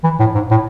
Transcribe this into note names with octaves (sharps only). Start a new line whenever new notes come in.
E3
A2
G#2
A2